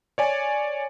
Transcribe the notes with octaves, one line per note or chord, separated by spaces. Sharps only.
C#5 D5 G#5